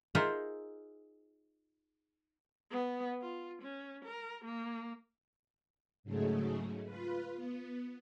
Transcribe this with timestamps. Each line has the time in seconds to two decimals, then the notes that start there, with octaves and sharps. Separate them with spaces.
0.15 D#4 F4 G#4 A#4 C5 E5
2.71 B3
3.21 F4
3.62 C#4
4.05 A#4
4.45 A#3
6.04 G#2 C#3 F#3 G#3 A3
6.85 F4 B4
7.35 B3